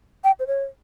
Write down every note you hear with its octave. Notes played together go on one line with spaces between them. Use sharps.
G5
C5
C#5